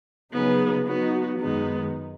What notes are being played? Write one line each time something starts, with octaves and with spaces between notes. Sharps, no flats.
C#3 F#3 B3 D#4 G#4 B4
F#3 B3 D#4 F#4
F#2 D#3 G#3 B3 D#4